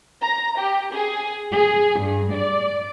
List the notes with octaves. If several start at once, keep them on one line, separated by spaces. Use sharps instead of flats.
A#5
G4
G#4
G#4
G2
D5